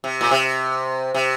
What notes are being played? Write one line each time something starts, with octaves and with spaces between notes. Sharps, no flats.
C3
A#2
C3
C3